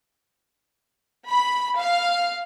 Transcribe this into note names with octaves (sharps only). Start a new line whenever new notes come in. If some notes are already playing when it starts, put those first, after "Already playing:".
B5
F5